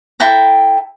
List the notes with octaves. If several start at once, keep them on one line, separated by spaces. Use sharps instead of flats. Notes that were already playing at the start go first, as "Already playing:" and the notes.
E4 A4 G5 A#5